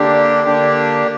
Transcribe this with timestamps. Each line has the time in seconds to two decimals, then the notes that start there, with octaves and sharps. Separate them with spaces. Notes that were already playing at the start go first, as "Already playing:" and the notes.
Already playing: D3 A#3 D4 G4
0.44 D3 A#3 D4 G4